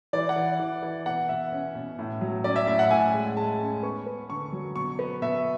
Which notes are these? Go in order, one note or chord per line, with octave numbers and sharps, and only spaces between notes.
E3 D5
F#5
E3
E3
E3
B2 F#5
B2 E5
C#4
B2
A2
F#3
C#4 D5
E5
A2 E5
F#5
A2 G#5
G#3
G#3 A5
C#4
B3 C#6
B3
D3 C#6
F#3
B2 C#6
B3
B2 E5